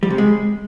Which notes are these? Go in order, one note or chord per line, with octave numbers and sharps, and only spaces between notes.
G3
C3
G#3